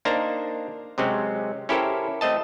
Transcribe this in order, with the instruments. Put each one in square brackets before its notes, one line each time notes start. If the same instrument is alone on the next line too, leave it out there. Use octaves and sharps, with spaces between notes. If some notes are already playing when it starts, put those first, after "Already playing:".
[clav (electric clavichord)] A#3 D4 D#4 C5 A5 A#5
C3 F#3 G#3 C4 C#4
C#4 E4 G4 A4 A#4 C5
A3 C4 D#5 A5